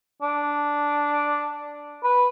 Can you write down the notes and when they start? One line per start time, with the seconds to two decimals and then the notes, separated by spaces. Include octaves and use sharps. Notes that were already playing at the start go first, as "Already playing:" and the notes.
0.22 D4
2.04 B4